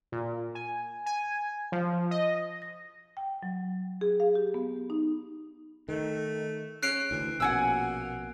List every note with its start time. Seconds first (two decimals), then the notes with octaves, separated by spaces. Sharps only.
0.12 A#2
0.55 G#5
1.06 G#5
1.72 F3
2.11 D#5
2.62 A#6
3.17 G5
3.43 F#3
4.01 G#4
4.20 F5
4.35 G4
4.54 B3
4.90 D#4
5.89 D#3 A3
6.83 C#4 F#6 C7 D7
7.11 D2 D3 E3
7.40 A#1 B2 A#3 C#4 F#5 G#5 E6